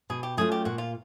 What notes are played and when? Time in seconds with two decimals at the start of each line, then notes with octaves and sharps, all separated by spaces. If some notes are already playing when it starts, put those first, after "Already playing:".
0.10 B2 G#4
0.23 G4
0.37 F#3 A3 C#4 F4 G#4
0.52 G4
0.65 A#2 F#4
0.78 F4